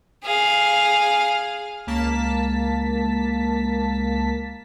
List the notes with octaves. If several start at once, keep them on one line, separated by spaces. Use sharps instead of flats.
G#4 F5
C#2 A#3 A5 B6